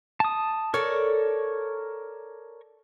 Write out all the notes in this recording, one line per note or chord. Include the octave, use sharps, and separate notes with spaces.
A5 D#6
A4 A#4 C#5 D5